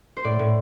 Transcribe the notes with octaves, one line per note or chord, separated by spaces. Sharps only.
C5
A2 D5
A2